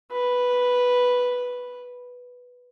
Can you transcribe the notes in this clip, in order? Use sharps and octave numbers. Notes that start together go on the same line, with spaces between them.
B4